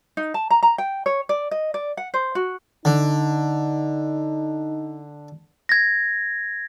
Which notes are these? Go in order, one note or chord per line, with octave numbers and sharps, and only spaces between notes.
D#4
A5
A#5
A#5
G5
C#5
D5
D#5
D5
F#5
C5
F#4
D3 D#4
G#6 A#6